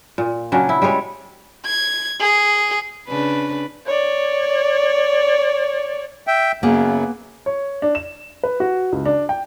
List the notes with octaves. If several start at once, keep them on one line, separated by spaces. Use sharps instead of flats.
A#2
C#3 F#3 C#4 D4
E4
G3 G#3 G#4 C#5
G#6
G#4
C#3 D4 B4
C#5 D5
E5 G5
F#2 C#3 F#3 A#3 B3 G#4
C#5
D4
E7
B4
F#4
C#2
D4
G5